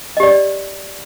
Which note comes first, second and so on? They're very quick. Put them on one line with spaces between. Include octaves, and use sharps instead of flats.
D#5 G4 D5